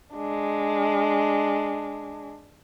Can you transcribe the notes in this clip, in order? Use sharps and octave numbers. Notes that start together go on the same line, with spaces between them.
G#3 D4